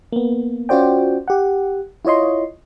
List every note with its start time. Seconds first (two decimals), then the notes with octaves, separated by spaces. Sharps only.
0.13 A#3 B3
0.69 C#4 F4 F#4 C5 D5 G5
1.28 G4 F#5
2.05 E4 F4 C#5 D#5 C6